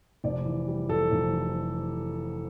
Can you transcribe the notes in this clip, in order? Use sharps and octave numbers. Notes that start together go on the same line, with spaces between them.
F1 D5
E3
G3
F2 A4
F1
E3